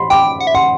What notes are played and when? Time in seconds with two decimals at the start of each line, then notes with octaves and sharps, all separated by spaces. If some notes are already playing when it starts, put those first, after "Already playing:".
Already playing: B5 C6
0.10 G5 D6
0.41 F#5
0.47 E5
0.55 F#5 C6